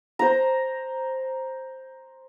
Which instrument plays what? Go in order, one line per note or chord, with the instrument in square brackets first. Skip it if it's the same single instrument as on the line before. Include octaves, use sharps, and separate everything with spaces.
[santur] C5 A#5